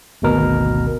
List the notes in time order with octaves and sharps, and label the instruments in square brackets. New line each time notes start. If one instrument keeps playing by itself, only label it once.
[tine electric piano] G#1 D2 B2 A#4